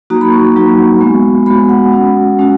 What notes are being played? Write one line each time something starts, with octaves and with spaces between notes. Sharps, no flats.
F#3 A#3 D#4 F#4 A#5
B5
C#6
B5
F#3 A#3 D#4 F#4
G#3 B3 F#4
G#3 B3 F#4 B5
F#5
G#3 C#4 F#4
G#3 C#4 F#4